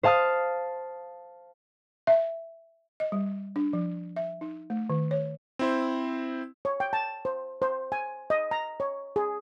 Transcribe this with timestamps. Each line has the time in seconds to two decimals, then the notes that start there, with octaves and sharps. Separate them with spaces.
0.03 C5 F5 A5 D#6 F6
2.07 E5
3.00 D#5
3.12 G3
3.56 D4
3.73 F3
4.16 E5
4.41 D#4
4.70 A3
4.90 D#3
5.11 C#5
5.59 C4 E4 C5
6.65 C#5
6.80 G5
6.93 A5
7.25 C5
7.62 C5
7.92 G#5
8.30 D#5
8.51 A#5
8.80 C#5
9.16 G#4